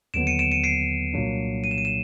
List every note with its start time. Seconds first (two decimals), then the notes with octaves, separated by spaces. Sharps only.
0.14 D#2 D3 F#3 B3 D7 E7
0.27 C#7 D#7
0.39 D7 E7
0.52 C#7 D#7
0.64 C7 D7
1.14 C2 A#2 F#3 A#3 D4
1.64 D#7
1.71 E7
1.78 D#7
1.85 E7